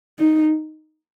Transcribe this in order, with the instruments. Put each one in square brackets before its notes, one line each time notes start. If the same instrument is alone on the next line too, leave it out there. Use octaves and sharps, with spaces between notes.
[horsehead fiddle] D#4